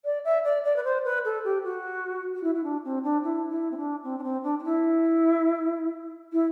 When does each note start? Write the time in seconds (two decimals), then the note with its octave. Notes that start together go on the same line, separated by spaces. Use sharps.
0.05 D5
0.24 E5
0.44 D5
0.64 D5
0.76 B4
0.84 C5
1.04 B4
1.25 A4
1.44 G4
1.64 F#4
2.35 F#4
2.43 E4
2.55 E4
2.63 D4
2.84 C4
3.03 D4
3.24 E4
3.50 E4
3.71 C4
3.77 D4
4.04 C4
4.18 D4
4.23 C4
4.43 D4
4.59 D4
4.64 E4
6.32 E4